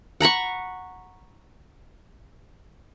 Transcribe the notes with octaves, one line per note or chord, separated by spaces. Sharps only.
F#5 A#5 B5 C#6